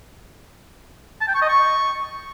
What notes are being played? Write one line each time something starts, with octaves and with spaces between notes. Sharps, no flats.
A5
G5
C#6
D#5
C#6